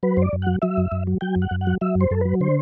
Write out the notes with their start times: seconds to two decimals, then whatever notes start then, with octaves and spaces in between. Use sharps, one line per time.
0.03 F#3 B4
0.17 F#2 C5 D5
0.33 F#2
0.42 F#3 F#5
0.62 F#3 E5
0.77 F#2
0.92 F#2
1.07 F#3
1.21 F#3 G5
1.36 F#2
1.42 F#5
1.51 F#2
1.61 F#5
1.67 F#3
1.81 F#3 E5
1.95 F#2
2.01 C5
2.11 F#2 A4
2.21 F#3 B4
2.41 D3 C5